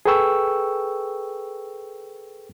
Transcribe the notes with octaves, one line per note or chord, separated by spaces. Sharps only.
G#4 A4 B4 G5 C#6 E6